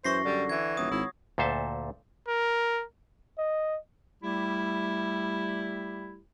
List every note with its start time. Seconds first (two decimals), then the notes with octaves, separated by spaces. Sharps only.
0.04 F#2 E3 C5 C#6 A#6 C7
0.25 D3 G3
0.49 E3 G#6
0.77 D#1 F#3 D#6
0.91 G#1 E4
1.38 D2 A#2 A4 C5 E5 A5
2.28 A#4
3.38 D#5
4.23 G3 A3 E4 G4